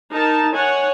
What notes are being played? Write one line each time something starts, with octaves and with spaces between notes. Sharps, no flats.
D#4 A#4 A5
C#5 F#5 G#5